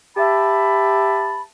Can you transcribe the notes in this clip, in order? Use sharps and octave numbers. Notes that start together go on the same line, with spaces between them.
G4 E5 A5 B5